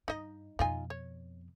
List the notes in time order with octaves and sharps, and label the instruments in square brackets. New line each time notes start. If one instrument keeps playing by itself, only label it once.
[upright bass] G2 [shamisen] D#4 D#5
[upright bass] F2 B2 [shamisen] D#4 F4 G#5
[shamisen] C#5